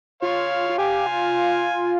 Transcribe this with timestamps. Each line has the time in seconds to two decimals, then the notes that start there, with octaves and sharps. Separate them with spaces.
0.22 F4 C#5 F5
0.69 F4
0.78 G4 F5 G#5
1.06 F4